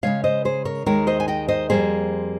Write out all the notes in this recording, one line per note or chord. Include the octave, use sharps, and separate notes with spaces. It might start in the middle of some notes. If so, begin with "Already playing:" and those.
C#3 F3 G#3 C#5 F5
C5 D#5
G#4 C5
A#4 C#5
D#2 D#3 G#3 A#4 C#5
C5 D#5
G#5
D#5 G5
C5 D#5
F2 C#3 G3 A#3 G#4 C5